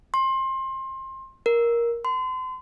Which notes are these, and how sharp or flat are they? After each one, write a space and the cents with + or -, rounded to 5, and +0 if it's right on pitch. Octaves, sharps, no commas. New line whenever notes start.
C6 +25
A#4 +10
C6 -35